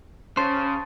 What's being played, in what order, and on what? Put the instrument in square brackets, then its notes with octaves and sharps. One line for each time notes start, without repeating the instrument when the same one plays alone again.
[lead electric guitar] C#3 [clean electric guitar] C5 [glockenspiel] A5 C6 A6